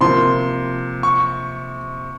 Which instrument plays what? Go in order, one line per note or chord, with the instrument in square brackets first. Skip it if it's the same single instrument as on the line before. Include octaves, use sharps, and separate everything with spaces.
[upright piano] C3 F3 A#3 [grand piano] C6
[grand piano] C#6